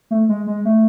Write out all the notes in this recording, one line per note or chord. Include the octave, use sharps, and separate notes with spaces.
A3
G#3
G#3
A3